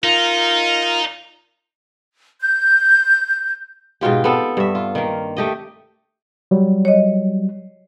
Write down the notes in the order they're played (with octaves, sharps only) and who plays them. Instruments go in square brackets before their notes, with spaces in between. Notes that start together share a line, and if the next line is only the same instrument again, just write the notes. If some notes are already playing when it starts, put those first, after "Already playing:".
[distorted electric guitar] D#4 [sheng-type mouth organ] F4 A#4
[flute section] G6
[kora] G#2 B2 F4 G4
B3 C4 A4
G2 E5
F4
D#3 A#3
A3 G4 D#5
[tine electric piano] F#3 G3
[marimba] C#5 D#5